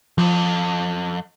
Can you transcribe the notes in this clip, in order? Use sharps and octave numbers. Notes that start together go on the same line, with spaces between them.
B1 F2 F3